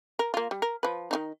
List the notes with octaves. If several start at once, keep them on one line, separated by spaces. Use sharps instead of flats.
A#4
A#3 F4
G3
A#4
F3 B4
D#3 D4 D#4